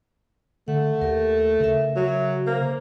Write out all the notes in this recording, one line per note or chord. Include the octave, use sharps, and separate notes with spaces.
D3 A3 F#5
D#2 G4 A#4
C#3 A#4 E5
F#3
A#3 C5